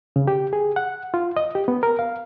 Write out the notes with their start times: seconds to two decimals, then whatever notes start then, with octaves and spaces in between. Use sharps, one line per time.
0.16 C#3
0.28 G4
0.53 G#4
0.76 F#5
1.14 F4
1.37 D#5
1.55 G4
1.68 B3
1.83 A#4
1.99 F5